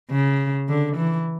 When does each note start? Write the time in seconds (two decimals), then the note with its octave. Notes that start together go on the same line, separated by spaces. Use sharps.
0.11 C#3
0.68 D3
0.97 E3